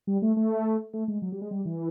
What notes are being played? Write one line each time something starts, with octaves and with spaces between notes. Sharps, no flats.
G3
A3
A3
A3
G#3
F#3
G3
G#3
G3
E3